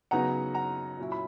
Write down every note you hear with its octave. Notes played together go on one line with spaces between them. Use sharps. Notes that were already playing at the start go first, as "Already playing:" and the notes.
C#3 F#3 B3 D#4 F#5 A#5
F#5 A#5
A#2 F#3 C#4 E4
B5